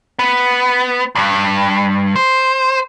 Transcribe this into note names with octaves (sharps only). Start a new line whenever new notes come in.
B3
E2 G2
C5